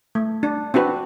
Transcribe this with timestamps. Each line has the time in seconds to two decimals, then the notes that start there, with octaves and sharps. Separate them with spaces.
0.15 A3
0.43 D4
0.74 C4 D4 F#4 B4